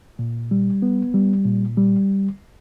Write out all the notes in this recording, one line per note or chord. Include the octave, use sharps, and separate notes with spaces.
A#2
G3
B3
G3
A#2
G3